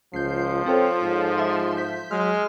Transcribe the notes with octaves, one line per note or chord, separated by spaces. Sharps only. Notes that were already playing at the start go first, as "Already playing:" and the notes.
C#2 F3 G6 C7
C4 F4 A4 C#5
G#2
E5 C6
G6 B6
F#3 G#3 F6